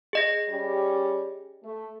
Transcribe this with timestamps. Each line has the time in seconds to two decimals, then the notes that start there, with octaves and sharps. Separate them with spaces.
0.13 G#4 D#5 A#6
0.49 G3 C#4 G4
1.63 A3